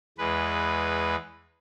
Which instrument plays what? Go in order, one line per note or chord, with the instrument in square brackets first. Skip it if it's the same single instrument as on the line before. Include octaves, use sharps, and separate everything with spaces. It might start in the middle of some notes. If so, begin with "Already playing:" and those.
[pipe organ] E2 G#3 B4